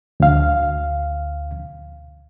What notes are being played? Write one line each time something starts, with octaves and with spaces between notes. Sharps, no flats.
D2 F5